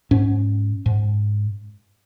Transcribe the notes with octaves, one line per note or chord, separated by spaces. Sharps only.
G#2 C#4
G#2